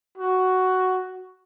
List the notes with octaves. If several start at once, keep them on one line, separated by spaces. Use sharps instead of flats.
F#4